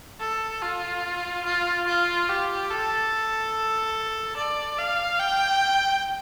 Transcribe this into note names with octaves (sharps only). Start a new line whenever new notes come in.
A4
F4
F4
F4
G4
A4
D5
F5
G5